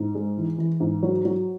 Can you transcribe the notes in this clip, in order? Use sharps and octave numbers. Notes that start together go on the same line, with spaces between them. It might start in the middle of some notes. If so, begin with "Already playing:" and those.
Already playing: G#2
G#3
E3
E3
G#2
F#3
F#3